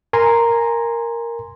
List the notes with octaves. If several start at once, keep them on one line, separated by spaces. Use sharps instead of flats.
A#4 G#5 A#5 C6